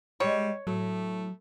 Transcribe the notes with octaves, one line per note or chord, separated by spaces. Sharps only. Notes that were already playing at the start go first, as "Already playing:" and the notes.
G3 G#3 C5 C#5 D#5
A2 F#3 A3